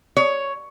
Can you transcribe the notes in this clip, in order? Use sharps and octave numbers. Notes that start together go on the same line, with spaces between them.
C#5